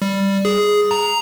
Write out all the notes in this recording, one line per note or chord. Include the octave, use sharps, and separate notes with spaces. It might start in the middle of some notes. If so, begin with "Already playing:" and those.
G3
G#4
A#5